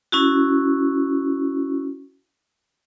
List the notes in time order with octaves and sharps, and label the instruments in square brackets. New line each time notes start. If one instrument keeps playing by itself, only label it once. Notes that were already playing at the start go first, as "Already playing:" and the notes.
[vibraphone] C#4 E4 F#4